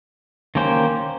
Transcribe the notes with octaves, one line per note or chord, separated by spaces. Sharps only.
D#3 A#3 C#4 G4 C5